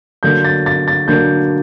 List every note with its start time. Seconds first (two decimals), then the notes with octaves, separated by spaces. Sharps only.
0.23 D3 F#3 A#3 D4 G6
0.45 A6
0.66 A6
0.88 A6
1.08 D3 F#3 A#3 D4 G6